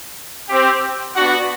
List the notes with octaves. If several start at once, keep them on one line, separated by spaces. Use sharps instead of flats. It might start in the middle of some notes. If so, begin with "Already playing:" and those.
C4 G4
B3 D4 F#4 F#5